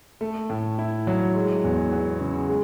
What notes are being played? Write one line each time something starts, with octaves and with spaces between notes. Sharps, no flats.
A3
A2
E4
F#3
G#3
E2
B3
C#3
G#3